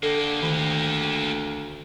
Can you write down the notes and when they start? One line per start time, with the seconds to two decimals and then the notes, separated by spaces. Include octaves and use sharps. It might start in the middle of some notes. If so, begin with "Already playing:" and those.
0.03 D3 A#3 G4 A4
0.42 D2 D#3